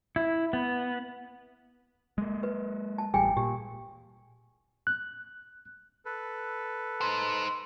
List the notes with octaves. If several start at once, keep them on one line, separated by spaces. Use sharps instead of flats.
E4
B3
G#3 A#3
B4
A5
D1 A1 G3 G#4 G5 G#5
A#2 G4
F#6
A4 B4
D#4 C5